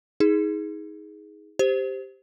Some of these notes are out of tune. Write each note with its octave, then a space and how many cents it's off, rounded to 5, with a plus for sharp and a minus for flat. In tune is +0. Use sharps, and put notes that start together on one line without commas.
D#4 +30 G#4 +0
G4 +0 C5 +0